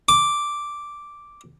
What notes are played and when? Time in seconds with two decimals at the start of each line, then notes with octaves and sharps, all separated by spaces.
0.09 D6